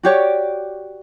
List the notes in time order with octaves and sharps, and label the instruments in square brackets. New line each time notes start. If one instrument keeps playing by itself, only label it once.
[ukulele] F#4 G4 C#5 D5